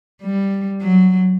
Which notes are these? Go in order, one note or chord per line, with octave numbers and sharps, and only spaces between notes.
G3
F#3